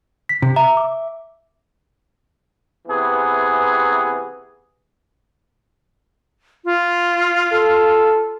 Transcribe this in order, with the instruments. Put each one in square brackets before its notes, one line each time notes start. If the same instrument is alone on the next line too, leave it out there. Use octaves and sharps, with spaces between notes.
[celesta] B6
[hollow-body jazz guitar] C3
[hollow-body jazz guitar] E5 [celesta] A#5
[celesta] D6
[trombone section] C3 E3 B3 G#4
[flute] F4
[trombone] A4